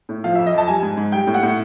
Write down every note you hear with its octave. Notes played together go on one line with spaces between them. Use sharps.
A2
F3 F5
F2 E5
D#5
F2 A5
G3 G#5
G#2
G#2
G3 G5
A2
F#5
A2